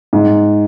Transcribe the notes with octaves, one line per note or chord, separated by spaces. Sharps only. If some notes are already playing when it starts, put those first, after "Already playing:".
G#2